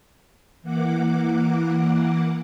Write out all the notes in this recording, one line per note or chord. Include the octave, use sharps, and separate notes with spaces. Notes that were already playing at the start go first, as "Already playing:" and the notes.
E3 A#3 F#5 D6